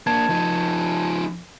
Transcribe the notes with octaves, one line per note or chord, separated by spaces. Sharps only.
A#3 D4 A5 G#6
F3 D#4